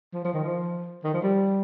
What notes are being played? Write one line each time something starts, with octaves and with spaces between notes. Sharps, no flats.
F3
F3
D#3
F3
D#3
F3
G3